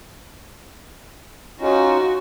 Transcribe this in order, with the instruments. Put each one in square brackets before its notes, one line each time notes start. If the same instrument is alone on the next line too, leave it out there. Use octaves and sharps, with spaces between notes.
[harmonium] C#4 D#4 F4 [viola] F#4